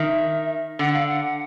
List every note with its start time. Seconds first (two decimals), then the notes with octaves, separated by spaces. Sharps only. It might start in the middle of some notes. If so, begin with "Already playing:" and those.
Already playing: D#3 E5
0.79 D3 F#5
0.94 F5
1.07 F#5